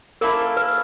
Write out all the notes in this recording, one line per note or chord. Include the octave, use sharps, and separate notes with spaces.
A#3 C#4 E4 A4 A#4
B4